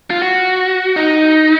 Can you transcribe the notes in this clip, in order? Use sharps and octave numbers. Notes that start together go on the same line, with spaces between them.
F4
F#4
D#4